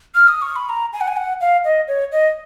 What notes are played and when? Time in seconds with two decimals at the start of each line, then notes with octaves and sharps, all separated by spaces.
0.15 F6
0.28 D#6
0.42 C#6
0.56 B5
0.69 A#5
0.93 G#5
1.01 F#5
1.08 G#5
1.17 F#5
1.40 F5
1.64 D#5
1.88 C#5
2.12 D#5